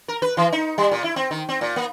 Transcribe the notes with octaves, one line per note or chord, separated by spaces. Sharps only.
A#4
B4
E3
D#4
G3
A#2
E4
C4
D#3
C4
A#2
A#3